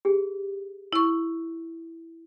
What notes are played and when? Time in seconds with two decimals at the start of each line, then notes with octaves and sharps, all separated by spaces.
0.05 G4 G#4
0.93 E4 C#6